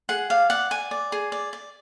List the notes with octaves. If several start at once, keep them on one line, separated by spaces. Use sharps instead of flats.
G#4 F#5
D5 F5
D5 F#5
D5 G#5
D5
G#4
D5
D5